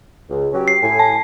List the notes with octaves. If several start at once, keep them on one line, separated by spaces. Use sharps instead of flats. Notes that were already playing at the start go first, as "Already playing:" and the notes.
C#2
F#3 C#4 G4
C7
A2 G#5
A5